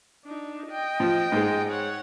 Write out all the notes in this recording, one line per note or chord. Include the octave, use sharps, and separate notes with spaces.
D4 D#4
D#5 G5
F3
G#2 G#3
C#5 F#5